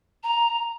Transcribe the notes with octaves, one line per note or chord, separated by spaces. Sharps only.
A#5